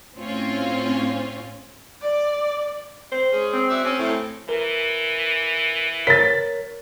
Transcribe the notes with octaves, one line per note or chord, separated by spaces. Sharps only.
A2 C4 C#4 F4
D5
C5
G#3 C#4 G#4
C4
F#4 D5 E5
C4 C#4 G#4
A2
E3 A#4
A#4 C#5 A6 B6